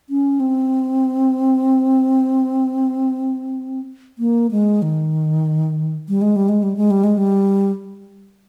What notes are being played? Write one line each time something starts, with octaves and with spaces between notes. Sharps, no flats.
C#4
C4
A#3
G#3
D#3
G3
G#3
G3
G#3
G3
G#3
G3
G#3
G3